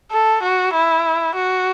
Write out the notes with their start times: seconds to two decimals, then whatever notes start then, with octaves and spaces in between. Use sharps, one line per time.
0.11 A4
0.43 F#4
0.73 E4
1.35 F#4